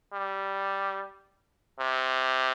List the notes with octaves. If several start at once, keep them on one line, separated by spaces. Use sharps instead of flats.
G3
C3